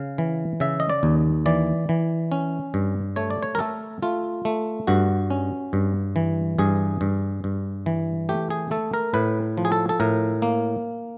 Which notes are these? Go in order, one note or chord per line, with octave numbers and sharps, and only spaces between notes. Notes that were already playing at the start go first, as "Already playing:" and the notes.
Already playing: C#3 F5
E3
C#3 E5
D#5
D5
D#2
E3 D5
E3
C#4
G2
A3 C#5
D5
C#5
A#4
A3 A4
A3 F4
A3
G2 F#4
C#4
G2
E3
G2 G#4
G2
G2
E3
A3 G4
G#4
A3 A4
A#4
A2 B4
F3
G#4
A4
A4
A2 A#4
A#3